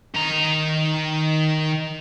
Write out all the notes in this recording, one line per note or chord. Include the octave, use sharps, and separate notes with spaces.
D#3 A#5